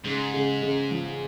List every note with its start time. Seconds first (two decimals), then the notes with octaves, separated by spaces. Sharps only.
0.04 G#2 C#3
0.33 C#3
0.62 C#3
0.91 F3